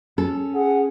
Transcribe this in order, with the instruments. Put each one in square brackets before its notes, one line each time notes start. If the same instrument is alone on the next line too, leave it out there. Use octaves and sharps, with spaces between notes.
[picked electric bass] C#4 [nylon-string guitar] A4
[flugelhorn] G#4 [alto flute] F#5